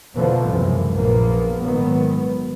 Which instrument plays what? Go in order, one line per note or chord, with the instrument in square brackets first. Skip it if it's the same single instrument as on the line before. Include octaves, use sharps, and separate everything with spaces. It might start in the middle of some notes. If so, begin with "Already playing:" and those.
[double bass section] F2 B2 D3 E3 F3 A#3
C#2 F#2 C3 E3 G#3
A#1 A#3 B3
G#2 D#3 F#3 B3